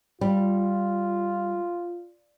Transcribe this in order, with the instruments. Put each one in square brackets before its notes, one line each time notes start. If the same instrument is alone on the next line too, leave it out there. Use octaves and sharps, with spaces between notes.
[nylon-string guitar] G3 [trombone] F4